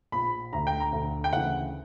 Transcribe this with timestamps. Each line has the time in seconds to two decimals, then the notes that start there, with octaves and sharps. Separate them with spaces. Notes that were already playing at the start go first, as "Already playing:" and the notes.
0.12 A#1 A#2 B5
0.52 D2 D3 A#5
0.67 G5
0.80 A#5
0.92 D2 D3
1.24 G5
1.33 D2 C#3 E3 F#5